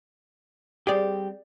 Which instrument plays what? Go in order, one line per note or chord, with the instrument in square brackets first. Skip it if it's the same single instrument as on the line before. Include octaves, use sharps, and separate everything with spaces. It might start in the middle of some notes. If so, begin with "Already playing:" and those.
[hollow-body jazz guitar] G3 C4 G4 [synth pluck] G#4 D5